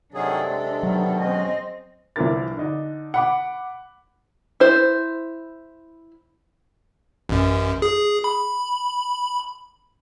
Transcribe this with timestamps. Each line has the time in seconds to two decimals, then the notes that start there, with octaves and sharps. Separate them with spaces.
0.14 C3 D#3 F#3 D4 G#4 A4
0.46 G#3
0.83 B2 D#3 F#3
1.20 G#3 C4 C#4 D#5
2.16 C2 E3 F3 D4 A#4 A6
2.57 D3 D4 D#4
3.14 F#5 B5 D6
4.60 E4 C5
7.29 A1 F#2
7.82 G#4
8.24 B5